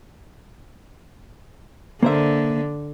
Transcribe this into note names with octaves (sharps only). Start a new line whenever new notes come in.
D3 A#3 C5 E5